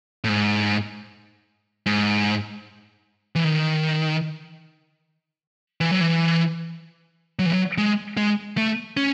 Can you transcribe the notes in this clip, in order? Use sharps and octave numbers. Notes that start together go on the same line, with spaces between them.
A2
G#2
G#2
E3
D#3
E3
F#3
E3
F#3
E3
F#3
G#3
G#3
A3
C#4